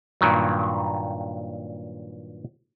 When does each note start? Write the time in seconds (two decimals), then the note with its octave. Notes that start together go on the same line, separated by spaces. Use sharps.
0.21 G2 A#2 D#3 F#3